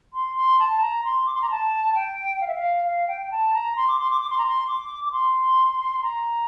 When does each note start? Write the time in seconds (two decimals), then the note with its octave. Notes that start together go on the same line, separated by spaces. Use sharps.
0.13 C6
0.36 C6
0.59 A5
0.81 A#5
1.04 C6
1.26 D6
1.34 C6
1.42 A#5
1.50 A5
1.94 G5
2.41 F5
2.47 E5
2.55 F5
2.85 F5
3.08 G5
3.21 G5
3.31 A5
3.54 A#5
3.76 C6
3.88 D6
3.99 C6
4.10 D6
4.21 D6
4.30 C6
4.38 A#5
4.47 C6
4.67 D6
5.05 D6
5.12 C6
6.02 A#5